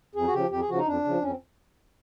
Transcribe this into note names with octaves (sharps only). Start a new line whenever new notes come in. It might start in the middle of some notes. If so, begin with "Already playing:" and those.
F2 G#4
F#4
C#3 F3 G4
F2 G4
G#4
C#3 F3 F#4
D#4
F2 D4
C#3 F3
F2 C#4
C4